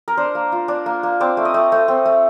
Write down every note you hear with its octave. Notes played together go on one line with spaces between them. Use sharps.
A#4
D4 C5
A#3
F4
D4
A#3
A#3
C4 D5
A3
D#5
A3
A3
C4
A3